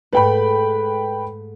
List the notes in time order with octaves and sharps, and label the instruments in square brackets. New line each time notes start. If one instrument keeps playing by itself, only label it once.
[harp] G#2 A3 [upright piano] B4 G5 B5